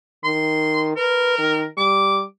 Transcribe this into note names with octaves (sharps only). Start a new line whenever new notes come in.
D#3 C6
A#4 B4
D#3
G3 D6